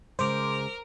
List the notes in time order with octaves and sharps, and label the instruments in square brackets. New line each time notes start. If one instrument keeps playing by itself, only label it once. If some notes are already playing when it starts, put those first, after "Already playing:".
[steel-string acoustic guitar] C#3 G#3 [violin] A#4 [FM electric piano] C5 D6